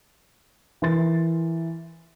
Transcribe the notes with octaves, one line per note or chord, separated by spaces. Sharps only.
E3 A#4 C6 A6